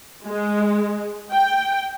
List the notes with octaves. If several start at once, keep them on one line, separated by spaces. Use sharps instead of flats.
G#3
G5